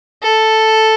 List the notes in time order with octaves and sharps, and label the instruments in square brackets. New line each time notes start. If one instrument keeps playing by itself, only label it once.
[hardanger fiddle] A4